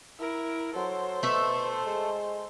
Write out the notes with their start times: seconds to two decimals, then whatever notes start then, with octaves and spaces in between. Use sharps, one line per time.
0.19 E4 A#4
0.75 F#3 A4 C5
1.23 B2 A3 E5
1.86 G#3